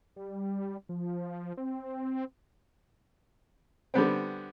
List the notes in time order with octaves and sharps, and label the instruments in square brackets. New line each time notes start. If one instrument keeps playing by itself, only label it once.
[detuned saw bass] G3
F3
C4
[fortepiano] D3 G3 B3 C4